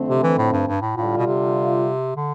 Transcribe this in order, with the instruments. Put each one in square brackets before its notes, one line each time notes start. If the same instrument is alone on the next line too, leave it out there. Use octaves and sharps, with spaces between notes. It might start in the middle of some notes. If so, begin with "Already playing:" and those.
Already playing: [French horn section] F2 D3 A3 C4
[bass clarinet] C3
E3
A2
G2
G2
A2
[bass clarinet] A2 [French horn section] D3 G3 D4 F4
[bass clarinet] B2
C3
D3